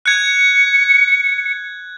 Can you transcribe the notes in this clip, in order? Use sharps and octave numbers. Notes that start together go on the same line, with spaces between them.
F#6 G#6 C#7